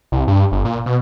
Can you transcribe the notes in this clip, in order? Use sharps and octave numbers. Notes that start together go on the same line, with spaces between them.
C2
G2
G1
A#2
B2